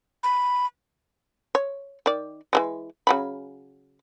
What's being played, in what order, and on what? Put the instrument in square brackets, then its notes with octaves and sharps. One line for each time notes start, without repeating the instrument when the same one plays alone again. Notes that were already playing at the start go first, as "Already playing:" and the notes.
[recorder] B5
[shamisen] C#5
D#3 D5
E3 G3 G#3
C#3 F#3 B5